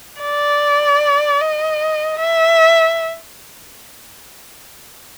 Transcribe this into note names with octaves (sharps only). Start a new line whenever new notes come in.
D5
D#5
E5